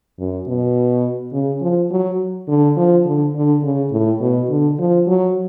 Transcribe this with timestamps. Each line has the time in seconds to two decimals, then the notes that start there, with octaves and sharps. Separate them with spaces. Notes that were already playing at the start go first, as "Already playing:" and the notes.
0.19 F#2
0.47 B2
1.33 C#3
1.61 F3
1.91 F#3
2.48 D3
2.77 F3
3.05 D3
3.35 D3
3.63 C#3
3.91 A2
4.20 B2
4.49 D3
4.79 F3
5.07 F#3